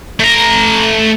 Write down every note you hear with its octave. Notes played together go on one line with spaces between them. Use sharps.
A3 A#5